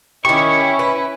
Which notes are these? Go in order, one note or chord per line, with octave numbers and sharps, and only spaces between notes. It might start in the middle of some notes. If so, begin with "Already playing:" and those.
D#3 C#4 E4 G4 C#6
B4